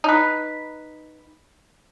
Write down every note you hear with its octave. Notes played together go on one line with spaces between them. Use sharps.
D#4 B4